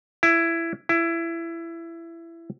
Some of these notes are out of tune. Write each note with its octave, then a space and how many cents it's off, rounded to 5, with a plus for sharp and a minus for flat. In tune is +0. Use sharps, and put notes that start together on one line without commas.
E4 +15
E4 +20